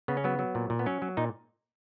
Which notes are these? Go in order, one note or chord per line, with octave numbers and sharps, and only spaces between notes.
C#3 B3
C#4
F#3 B3
F#3
A#2
A#2
B3
F#3 C#4
F#3
A#2 D#4